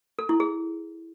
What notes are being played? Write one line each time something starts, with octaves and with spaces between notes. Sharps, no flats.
A4
E4
G#4